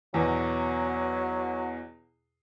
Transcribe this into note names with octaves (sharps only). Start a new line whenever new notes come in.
E2 B2 F#3